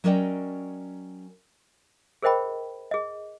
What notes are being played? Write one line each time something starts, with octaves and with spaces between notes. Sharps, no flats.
F#3 C#4 A#4 D5 D#5 G5
G#4 A#4 C5 D#5 G5 B5
G#4 D#5